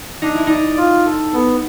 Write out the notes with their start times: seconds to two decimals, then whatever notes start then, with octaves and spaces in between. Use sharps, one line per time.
0.22 D4 D#4
0.35 E4
0.47 D#4 D5
0.77 F4
1.06 A4
1.33 B3